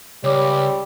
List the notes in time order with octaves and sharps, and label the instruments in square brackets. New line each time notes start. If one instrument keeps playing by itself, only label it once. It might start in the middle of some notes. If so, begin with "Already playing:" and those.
[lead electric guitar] C#2 [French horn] G3 [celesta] C#5 D6